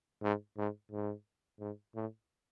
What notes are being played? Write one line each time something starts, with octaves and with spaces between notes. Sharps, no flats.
G#2
G#2
G#2
G#2
A2